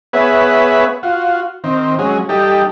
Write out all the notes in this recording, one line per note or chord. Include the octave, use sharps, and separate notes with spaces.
B3 G#4 B4 C#5 E5 F#5
F4 F#4
D#3 C4
F#3 G#3 C#4
G3 D#4 G4 A4